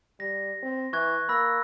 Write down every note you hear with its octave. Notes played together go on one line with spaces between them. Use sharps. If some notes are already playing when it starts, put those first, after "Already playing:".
G3 A#6
C4
E3 C#6 F#6 G#6
A#3 B5 E6 A#6